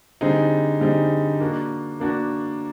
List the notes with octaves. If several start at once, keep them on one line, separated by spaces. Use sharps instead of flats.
D3 G3 C4 D#4 G#4
D3 G3 C4 D#4 G#4
A#3 D4 F#4
A#3 D4 F#4